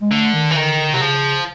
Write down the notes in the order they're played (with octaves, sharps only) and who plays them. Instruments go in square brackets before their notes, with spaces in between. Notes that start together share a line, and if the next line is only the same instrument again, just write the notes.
[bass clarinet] G#3
[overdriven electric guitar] D3 [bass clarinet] A3
[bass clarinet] D#3
[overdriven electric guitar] E3
[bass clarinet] D3 [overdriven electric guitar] D#3
[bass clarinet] D3
[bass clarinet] C3 [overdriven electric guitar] F#3
[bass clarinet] C#3 [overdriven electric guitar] F3